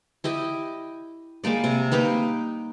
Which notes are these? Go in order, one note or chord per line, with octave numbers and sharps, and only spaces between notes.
E4 G4 D#5
G3 G#3 A#3 D5
C3
A#3 D#4 G4 B4